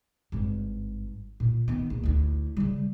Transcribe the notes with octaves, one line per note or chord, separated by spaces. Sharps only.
G#1 G2
A#2
D#3 B3
A#1
D2 E4
C#3 G3